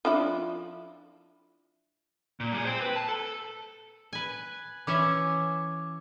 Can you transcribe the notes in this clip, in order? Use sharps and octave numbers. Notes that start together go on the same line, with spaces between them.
F3 D4 E4
A#2
G3 G#4
C5 G5
B4
A5
A4
B4 G#5
E3 C#4 E5 D6